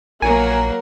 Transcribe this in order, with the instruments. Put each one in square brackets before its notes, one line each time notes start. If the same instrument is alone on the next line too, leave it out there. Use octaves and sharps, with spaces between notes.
[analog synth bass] A#1 [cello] F#3 A#3 [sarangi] A#4 [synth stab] G#5